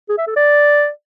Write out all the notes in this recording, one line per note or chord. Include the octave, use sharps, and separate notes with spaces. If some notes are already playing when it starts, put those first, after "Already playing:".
G#4
E5
A4
D5